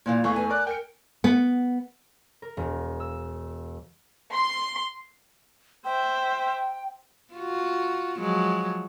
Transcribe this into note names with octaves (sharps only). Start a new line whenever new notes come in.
A#2 E3 F4
E2 E3 A3 F5 C#6
B4 G#5
A#4 D5 F#6
A#4 G5 C#7
B3
A#4
E1
E6
C6
C5 E5 G5
F4 F#4
F3 F#3 G#3